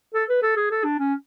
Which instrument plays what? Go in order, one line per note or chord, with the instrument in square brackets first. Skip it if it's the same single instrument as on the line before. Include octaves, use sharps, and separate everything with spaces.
[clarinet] A4
B4
A4
G#4
A4
D4
C#4